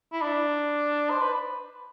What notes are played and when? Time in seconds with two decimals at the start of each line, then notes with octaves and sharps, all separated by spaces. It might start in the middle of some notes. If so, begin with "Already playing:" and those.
0.13 E4
0.22 D4
1.11 C5
1.21 B4